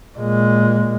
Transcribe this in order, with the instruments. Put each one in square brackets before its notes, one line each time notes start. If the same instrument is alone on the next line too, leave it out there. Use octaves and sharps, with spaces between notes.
[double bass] A#2 G#3